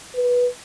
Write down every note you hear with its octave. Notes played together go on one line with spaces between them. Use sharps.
B4